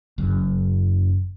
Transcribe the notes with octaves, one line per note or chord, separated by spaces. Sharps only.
F#1 F#2